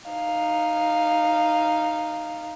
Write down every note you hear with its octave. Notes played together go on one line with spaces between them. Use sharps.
D#4 F5